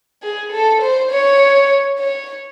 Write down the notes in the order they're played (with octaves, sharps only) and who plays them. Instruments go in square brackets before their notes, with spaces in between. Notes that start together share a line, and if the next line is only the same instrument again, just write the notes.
[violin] G#4
A4
C5
C#5
C#5